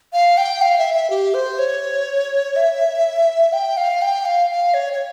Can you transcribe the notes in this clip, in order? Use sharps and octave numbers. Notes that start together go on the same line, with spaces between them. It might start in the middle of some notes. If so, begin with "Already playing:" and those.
F5
G5
F5
E5
E5
G4
C5
C#5
E5
G5
F5
G5
F5
F5
C#5
C#5